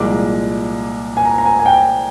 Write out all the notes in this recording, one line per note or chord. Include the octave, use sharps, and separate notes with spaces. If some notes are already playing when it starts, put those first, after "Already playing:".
Already playing: C2 A#2 F3 G#3 D6
G#5
A#5
A#5
G#5
G#5
G5